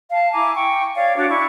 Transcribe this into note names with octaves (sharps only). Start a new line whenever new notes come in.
F5 A5
E4 G#5 A#5 D6
G5 C#6
C#5 D5 F5
D4 F#4 C#5 D6
E4 D5 C#6